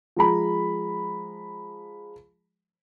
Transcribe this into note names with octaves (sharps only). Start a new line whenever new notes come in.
F3 G#3 A#5 B5